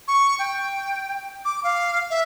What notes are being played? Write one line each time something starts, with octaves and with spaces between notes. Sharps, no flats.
C#6
G5
D6
F5
E5